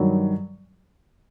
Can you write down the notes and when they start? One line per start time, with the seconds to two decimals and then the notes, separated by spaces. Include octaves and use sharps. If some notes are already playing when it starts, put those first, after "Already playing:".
Already playing: G2 D#3 F#3